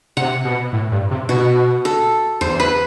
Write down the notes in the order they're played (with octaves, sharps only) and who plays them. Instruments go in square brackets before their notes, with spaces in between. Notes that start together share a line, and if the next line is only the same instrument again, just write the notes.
[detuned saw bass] C3 [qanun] F#5
[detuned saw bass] B2
A2
G2
C3
[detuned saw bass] B2 [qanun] F#4
[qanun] A4
[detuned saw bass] E2 [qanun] C5
[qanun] B4